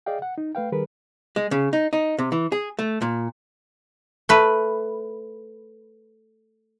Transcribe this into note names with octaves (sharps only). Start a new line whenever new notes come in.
G#4 D5 D#5 F5 G5
F#5
D#4
A3 B4 F5 G5
D#3 G3 G#4 A#4 B4
G#3
C#3
D#4
D#4
C3
E3
G#4
A3
A#2
A3 B4